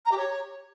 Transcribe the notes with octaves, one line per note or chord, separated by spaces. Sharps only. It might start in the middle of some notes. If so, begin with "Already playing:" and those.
A#5
G4
C#5